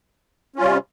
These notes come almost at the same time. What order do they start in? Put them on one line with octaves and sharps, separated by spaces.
C#4 F4 G3 C3